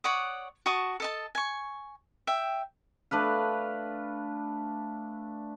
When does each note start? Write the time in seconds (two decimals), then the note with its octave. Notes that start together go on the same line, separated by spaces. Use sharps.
0.04 C#5 D5 F#5 D#6
0.66 F#4 A5 C#6 D#6
1.00 A4 D#5 A5
1.35 G#5 C#6
2.27 E5 G5
3.11 A3 D4 B4 F5